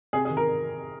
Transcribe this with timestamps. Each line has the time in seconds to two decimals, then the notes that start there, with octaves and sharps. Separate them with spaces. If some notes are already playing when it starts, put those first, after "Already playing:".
0.13 C3 G#4
0.25 G#4
0.30 D#3
0.37 A#4